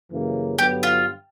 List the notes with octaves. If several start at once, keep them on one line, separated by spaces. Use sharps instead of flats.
F#2 C#3 E3 G3 A#3
G2 D3 F#3 B3 G4
F4